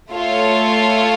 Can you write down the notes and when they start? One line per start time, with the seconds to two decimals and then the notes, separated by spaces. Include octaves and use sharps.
0.11 A3 F4 A4 C#5